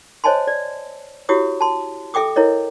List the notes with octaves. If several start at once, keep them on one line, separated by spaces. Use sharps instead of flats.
C5 C#5 D#5 G#5 A5 C6
D5
E4 F#4 G4 C#5 D#6
A5 C6
A4 E5 G5 D6 D#6
E4 A#4 C#5 D#5